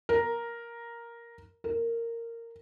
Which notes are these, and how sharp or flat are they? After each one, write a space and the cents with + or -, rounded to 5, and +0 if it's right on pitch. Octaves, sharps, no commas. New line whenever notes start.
A#4 +5
A#4 -15